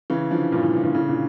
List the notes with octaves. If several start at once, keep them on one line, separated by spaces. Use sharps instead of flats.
C#3 E3
D3 F3
G2 A#2
A2
A2
G2 A#2
A2 C#3
A#2 D3